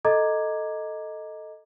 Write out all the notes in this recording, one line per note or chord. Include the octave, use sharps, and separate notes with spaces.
A4 D#5 A#5 D6 G#6